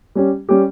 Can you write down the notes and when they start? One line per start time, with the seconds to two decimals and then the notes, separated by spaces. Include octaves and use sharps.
0.15 G3 C#4 G4
0.49 G3 C#4 G4